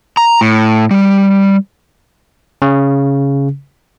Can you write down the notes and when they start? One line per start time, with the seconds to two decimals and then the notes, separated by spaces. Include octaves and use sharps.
0.17 A#5
0.41 A2
0.91 G3
2.62 C#3